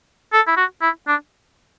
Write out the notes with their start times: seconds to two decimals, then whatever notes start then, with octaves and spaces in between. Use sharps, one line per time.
0.33 A4
0.47 E4
0.57 F#4
0.82 E4
1.07 D4